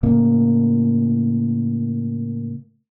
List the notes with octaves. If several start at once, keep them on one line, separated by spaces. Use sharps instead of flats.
A2 C#3 A#3